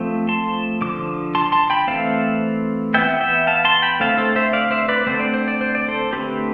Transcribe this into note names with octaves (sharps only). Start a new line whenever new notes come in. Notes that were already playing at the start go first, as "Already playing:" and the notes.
Already playing: F3 A3 C4
A5 C6
D3 F3 D6
A5 C6
A5 C6
G5 B5
E3 A3 C4 F5 A5
E3 B3 E5 G5
E5 G5
F5 A5
A5 C6
G5 B5
D3 A3 C4 F5 A5
A4 C5
C5 E5
D5 F5
C5 E5
B4 D5
D3 A3 C4 C5
D5
C5
D5
C5
D5
A4 C5
D3 A3 C4 G4 B4